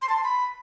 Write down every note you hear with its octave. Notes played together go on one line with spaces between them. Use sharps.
C6
A5
C6
B5